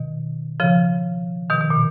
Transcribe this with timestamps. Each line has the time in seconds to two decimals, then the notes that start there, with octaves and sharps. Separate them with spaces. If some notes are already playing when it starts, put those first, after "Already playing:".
Already playing: B2 D#3
0.60 C#3 F3
1.50 B2 D#3
1.61 B2
1.70 A#2